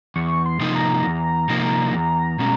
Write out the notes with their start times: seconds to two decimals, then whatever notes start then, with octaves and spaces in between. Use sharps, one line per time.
0.16 E2 C#6
0.46 C6
0.60 C3 F3 A#3 D#4
0.75 A#5
1.05 E2
1.49 C3 F3 A#3 D#4
1.93 E2
2.39 B2 G#3 C#4